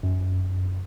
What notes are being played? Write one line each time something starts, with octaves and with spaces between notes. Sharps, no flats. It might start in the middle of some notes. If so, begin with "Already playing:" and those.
F#2